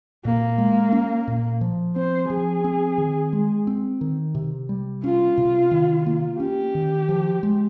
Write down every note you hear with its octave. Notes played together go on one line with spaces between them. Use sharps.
A#2 A#3
G#3
C#4
A#2
F3
C4 C5
F3 G#4
C4
D#3
G#3
C4
D#3
C3
G3
C#4 F4
C3
D#3
A#3
C#4 G4
D#3
F3
G#3